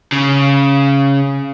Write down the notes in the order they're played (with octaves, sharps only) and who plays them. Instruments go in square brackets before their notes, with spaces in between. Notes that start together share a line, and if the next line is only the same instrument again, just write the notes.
[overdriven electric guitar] C#3